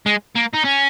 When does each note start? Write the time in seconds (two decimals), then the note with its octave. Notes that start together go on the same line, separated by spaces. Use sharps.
0.06 G#3
0.36 A#3
0.54 D#4
0.65 C#4